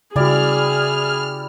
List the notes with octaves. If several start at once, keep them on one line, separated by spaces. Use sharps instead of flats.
C#3 G3 E4 F#4 G#4 D5 F6